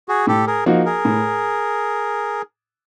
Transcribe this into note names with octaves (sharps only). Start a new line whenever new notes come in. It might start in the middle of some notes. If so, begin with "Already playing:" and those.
F#4 G#4
A2 G4 A4
G#4 A#4
F3 A#3 D#4 F#4
G#4 A#4
A2